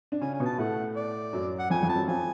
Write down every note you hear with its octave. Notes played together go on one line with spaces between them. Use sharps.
D4
C#3 C#4 G#5
G#5
B2 B3
A5
A2 A3 F#5
D5
F#2 F#3
F#5
F2 F3 G#5
F2 F3
A5
F#2 F#3
F2 F3 G#5